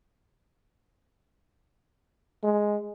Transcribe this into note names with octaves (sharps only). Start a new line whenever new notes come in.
G#3